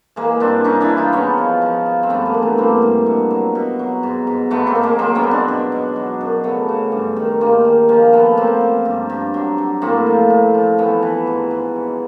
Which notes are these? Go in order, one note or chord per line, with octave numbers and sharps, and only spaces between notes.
E3 G#3 A#3
G2 C4 D4
G2 C#4 D#4
D4 E4
E3
D#4 F4
G#2 B3 C#4
F3
F3
F3
C4
G2 A3 B3
G#3 A#3
E3
A3 B3
G2 A#3 C4
G2
B2
F#3
B2
F#3
G#2
G#2
G#2 A3 B3
A#3 C4
G#2
G#3 A#3
F#3 A#3 C4
B3 C#4
B2
C4 D4
B2
B2
F#3
F#2
C#3 A3 B3
C#3
G2
D#3
G2 G#3 A#3
D#3
F3 G#3 A#3
F3 A3 B3
F3 A#3 C4
F3
G2
G2
F#3
F#3
A2 A#3 C4
F3
A2
F3
E3 A3 B3
E3
G#2
G#2
B2